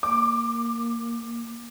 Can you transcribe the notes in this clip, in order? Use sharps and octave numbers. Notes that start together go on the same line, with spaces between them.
A#3 D6